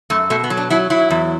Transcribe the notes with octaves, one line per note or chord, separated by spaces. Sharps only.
F#2 A3
B2 A3
B3
F#3
D4
F#3 E4
F#3 E4
E2